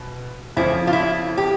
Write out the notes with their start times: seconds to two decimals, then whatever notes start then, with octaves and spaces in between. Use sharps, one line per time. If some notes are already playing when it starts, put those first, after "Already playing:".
Already playing: B2
0.57 F2 C#3 F3 E4
0.87 F4
0.93 E4
1.38 G4